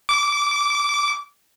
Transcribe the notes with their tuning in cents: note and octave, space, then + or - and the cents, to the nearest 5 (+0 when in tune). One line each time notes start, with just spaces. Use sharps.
D6 -20